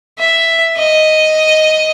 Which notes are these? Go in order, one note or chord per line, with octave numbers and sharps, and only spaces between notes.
E5
D#5